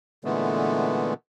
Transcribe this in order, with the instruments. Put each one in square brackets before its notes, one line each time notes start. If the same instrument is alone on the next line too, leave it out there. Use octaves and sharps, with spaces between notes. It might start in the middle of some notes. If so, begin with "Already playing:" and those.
[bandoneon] A#2 D3 E3 G#3 A3 B3